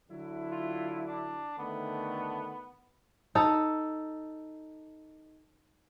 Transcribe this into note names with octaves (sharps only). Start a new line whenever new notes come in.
D3 F#3 E4
F4
D4
D3 D#3 A3 B3
D#4 A4